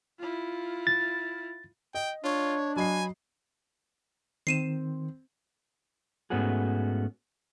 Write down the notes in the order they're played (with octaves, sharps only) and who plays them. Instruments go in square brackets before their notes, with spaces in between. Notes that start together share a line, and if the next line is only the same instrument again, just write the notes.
[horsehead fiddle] E4 F4
[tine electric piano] A6
[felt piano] D#5 [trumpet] G5
[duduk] D4 [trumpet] F4 [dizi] C#5
[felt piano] F#3 D#5 C7 [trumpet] G#5 [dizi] B5
[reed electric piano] D#3 [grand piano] C4 [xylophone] C7 D#7 E7
[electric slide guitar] G#2 A3 B3 C#4 F#4 G#4